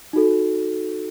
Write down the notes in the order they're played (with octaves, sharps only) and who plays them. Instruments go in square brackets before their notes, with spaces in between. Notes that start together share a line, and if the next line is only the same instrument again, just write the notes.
[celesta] D#4 F#4 A4